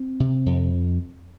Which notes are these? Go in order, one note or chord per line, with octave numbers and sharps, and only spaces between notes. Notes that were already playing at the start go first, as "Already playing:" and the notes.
Already playing: C4
C3
F2